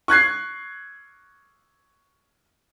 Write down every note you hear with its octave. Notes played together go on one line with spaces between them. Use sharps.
C#6 F#6 G#6 C7